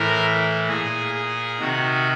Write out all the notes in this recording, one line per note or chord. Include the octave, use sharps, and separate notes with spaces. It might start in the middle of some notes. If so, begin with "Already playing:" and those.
Already playing: A2 E3 A#4
A#2 G#4
G#4
C3 D#3 F#4